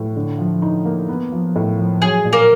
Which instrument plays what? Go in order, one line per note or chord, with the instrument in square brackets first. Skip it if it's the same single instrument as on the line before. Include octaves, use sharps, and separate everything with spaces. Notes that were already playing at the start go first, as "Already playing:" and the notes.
Already playing: [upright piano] A2
D3
F3
D#4
A#3
B3
F3
A2
F3
[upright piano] F#3 [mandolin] G#4
[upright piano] A#2
[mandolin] A#3 A#4